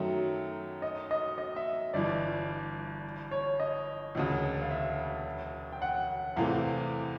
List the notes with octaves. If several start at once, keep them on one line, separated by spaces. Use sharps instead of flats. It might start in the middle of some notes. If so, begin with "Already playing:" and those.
Already playing: F#2 D#3 F#3 A3 E5
D#5
D#5
D#5
E5
G1 G2 E3 D5
C#5
D#5
E1 D2 C#3
F5
E5
G5
F#5
E2 C3 E3 A3 F5